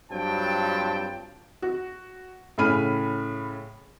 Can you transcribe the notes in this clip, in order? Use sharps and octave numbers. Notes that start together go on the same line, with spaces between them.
G2 F#3 C4 F4 G5 A5
F#4
A2 C#3 G#4 B5 F6 D#7